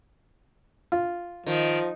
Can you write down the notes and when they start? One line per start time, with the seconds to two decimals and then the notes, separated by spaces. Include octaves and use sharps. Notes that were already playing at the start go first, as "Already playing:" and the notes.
0.92 F4
1.47 D#3 F3